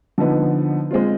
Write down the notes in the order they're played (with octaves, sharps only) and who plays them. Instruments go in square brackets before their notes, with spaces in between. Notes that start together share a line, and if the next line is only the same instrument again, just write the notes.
[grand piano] D3 F3 B3 D#4
G#3 C4 F4